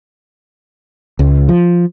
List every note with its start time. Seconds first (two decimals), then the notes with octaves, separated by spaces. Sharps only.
1.19 C#2
1.49 F3